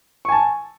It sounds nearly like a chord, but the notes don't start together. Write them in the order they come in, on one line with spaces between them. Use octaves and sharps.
C#6 G#5 A5